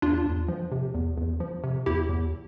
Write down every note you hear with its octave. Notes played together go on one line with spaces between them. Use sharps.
E2 D4 F4
E2
F3
C3
E2
E2
F3
C3
E2 E4 G4
E2